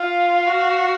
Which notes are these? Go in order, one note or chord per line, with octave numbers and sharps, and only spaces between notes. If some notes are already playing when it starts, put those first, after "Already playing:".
Already playing: F4 F5
F#4